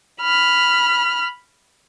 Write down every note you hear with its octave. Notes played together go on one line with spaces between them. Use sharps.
B5 F6